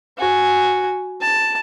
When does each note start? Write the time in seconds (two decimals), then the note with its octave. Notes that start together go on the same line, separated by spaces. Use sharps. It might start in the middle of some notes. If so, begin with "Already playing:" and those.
0.18 F#4 G#5
1.21 A5